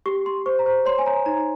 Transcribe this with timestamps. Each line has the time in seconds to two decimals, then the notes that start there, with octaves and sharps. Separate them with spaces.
0.06 G4 C#6
0.25 G4 C6
0.46 C5 C#6
0.59 A#5
0.66 C5
0.86 C#5 C6
0.98 G#5
1.06 C#5 A#5
1.26 D#4 A#5